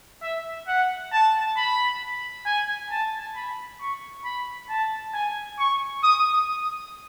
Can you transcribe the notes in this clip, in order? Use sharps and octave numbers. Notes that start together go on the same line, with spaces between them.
E5
F#5
A5
B5
G#5
A5
B5
C#6
B5
A5
G#5
C#6
D#6